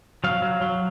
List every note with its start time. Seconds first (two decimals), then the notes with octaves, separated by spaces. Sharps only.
0.24 F#3 F5
0.42 F#3
0.61 F#3